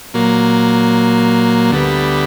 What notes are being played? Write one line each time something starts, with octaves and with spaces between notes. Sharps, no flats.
A#2 F#3 A#3
D2 D3 G3 B3